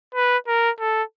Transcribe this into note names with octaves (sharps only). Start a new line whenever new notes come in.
B4
A#4
A4